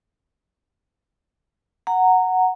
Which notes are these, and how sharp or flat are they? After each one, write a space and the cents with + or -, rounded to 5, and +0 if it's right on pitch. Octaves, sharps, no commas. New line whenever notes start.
F#5 +0 A#5 -15